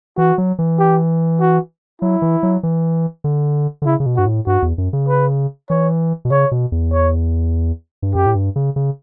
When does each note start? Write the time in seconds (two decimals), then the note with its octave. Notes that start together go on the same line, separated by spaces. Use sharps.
0.18 E3 F#4
0.38 F#3
0.59 E3
0.79 G4
1.40 F#4
2.01 F#3 E4
2.22 E3
2.43 F#3
2.63 E3
3.24 D3
3.82 D3
3.86 C#3 E4
4.00 C#3
4.06 B2
4.16 G2 F#4
4.26 A2
4.47 G2 F#4
4.62 E2
4.78 F#2
4.93 C#3
5.08 B4
5.70 E3 C#5
6.25 B2
6.30 C#3 C#5
6.52 B2
6.72 E2
6.92 C#5
8.02 G2
8.15 F#2 G4
8.26 A2
8.35 G2
8.56 C#3
8.76 C#3